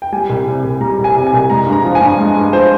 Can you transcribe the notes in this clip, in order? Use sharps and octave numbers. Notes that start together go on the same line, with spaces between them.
G5
G3 G#5
C2
C3
C2
G3 A#5
C2
G#5
C3
G#5
C2
G#3 A#5
G2
A#5
F3
G#5
G2
G#3
G2
F3 C5